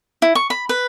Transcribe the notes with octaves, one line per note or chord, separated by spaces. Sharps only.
E4
C#6
B5
B4